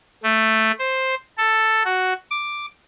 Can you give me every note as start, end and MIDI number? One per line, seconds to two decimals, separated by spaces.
0.24 0.72 57
0.79 1.15 72
1.38 1.83 69
1.85 2.13 66
2.31 2.66 86